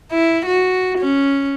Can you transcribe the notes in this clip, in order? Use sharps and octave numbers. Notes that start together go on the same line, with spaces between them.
E4
F#4
C#4